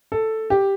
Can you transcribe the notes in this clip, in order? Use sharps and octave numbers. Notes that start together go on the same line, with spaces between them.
A4
G4